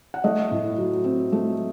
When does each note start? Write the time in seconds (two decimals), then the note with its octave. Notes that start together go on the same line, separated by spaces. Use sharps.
0.14 F#5
0.24 A3 D#5
0.51 A2
0.78 F#3
1.04 C4
1.32 A3